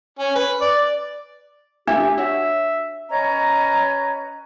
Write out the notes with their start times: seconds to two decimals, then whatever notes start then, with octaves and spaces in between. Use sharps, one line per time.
0.19 C#4
0.36 B4
0.62 D5
1.87 D4 G4 E5
2.18 F#4 C#5 E5
3.09 C#4 B4 D#5 A#5